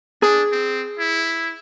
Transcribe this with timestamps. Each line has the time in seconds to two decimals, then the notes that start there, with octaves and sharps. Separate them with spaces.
0.22 D4 G#4
0.52 C4
0.99 E4